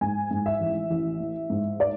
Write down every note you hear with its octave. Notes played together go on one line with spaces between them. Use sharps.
G#2 G#5
G#2
E5
A1
A1
E3
G#2
D5